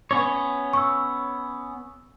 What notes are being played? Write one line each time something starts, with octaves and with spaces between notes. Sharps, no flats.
B3 C#4 C#5
C#6 E6